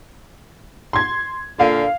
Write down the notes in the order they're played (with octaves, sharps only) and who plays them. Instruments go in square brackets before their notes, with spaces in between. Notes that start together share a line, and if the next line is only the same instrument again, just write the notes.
[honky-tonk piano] C6 G#6
[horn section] A#2 D3 [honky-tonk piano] F5